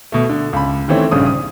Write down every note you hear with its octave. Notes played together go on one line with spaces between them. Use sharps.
B2 A3
D3
C#2 B5
D#3 E3 A3 C4 C#4
A#1 G2 C#3 C#4 D#6
D#6